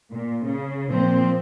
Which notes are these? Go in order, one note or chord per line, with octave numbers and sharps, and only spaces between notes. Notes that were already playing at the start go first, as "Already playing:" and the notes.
A#2
C#3
A#2 F3 C4